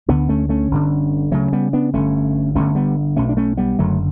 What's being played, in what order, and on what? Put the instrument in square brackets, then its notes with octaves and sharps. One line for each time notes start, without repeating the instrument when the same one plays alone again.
[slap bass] D2 D3 B3 D4
A3 C#4
A3 C#4
G1 G2 D3
D2 C#3 F#3 A3
G3 B3
B3 D4
G1 G2 D3 A3 C#4
G1 G2 D3 A3 C#4
G3 B3
B1 B2 A3 C#4
D4
A3 C#4
G3 B3
F#1 F#2 D3 F#3 A3